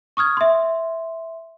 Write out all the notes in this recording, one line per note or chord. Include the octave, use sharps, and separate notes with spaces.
C#6 D#6 F6 G#6
E5 C6